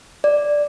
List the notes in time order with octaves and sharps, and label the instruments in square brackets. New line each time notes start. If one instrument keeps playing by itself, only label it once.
[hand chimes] D5